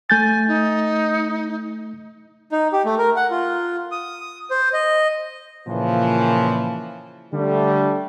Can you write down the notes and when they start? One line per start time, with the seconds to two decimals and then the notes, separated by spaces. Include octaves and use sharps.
0.10 A3 G#5 G6 A6
0.48 D#4
2.52 D#4
2.73 G4
2.85 A3
2.98 A#4
3.16 F#5
3.31 F4
3.92 D#6
4.51 C5
4.73 D#5
5.68 A#2 C#3 E3 F3
7.33 D3 G3 A3